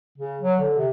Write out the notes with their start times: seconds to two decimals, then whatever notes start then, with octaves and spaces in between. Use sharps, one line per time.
0.18 C#3
0.42 F#3
0.60 D3
0.77 C3